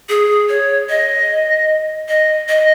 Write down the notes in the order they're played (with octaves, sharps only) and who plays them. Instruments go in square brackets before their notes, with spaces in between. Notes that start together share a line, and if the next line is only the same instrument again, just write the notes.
[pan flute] G#4
C#5
D#5
D#5
D#5